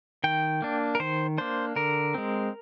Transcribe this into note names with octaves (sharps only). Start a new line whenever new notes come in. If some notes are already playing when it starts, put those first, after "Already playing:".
D#3 G5
A#3 D4
A#4
D#3 C5
A#3 D4 C5
D3 A#4
G#3 C4